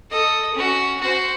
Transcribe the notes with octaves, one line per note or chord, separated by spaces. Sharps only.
A4 D#5
C#4 F#4
F#4 C5